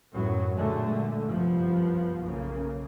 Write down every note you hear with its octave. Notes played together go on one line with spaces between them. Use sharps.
F#2 A2 F#3 B3
A#2 D3 G#3 A3
G1 C2 F#2 F3 B3
B1 C#3 A#3